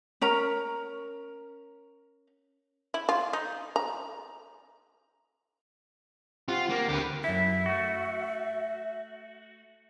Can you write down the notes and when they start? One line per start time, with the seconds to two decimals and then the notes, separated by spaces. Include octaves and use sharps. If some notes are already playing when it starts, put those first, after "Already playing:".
0.21 C#4 A#4 A#5
2.94 E4
3.09 F4
3.33 D#4
3.76 A#5
6.48 C4 F4 G4 F#5
6.70 A#3
6.89 D2 D3 G4 A#4 B4
7.24 F#2 E4 E5
7.66 A3 F#4